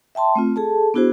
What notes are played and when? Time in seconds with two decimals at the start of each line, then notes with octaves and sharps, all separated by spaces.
0.15 E5 G5 A5 C6
0.35 A3 C4 F4
0.56 G#4 A4 A5
0.94 B3 D4 E4 F#4 G#4 C5